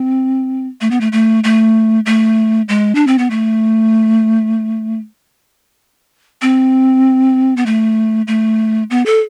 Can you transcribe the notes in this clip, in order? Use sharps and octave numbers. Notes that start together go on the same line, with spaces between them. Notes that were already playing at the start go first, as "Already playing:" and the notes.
Already playing: C4
A3
B3
A3
A3
A3
A3
G#3
D4
C4
B3
A3
C4
B3
A3
A3
B3
A4